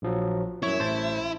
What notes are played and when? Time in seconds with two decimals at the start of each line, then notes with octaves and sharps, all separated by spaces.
0.02 A#1 F3 F#3
0.63 F#2 E4 C#5
0.79 A1 C5 A5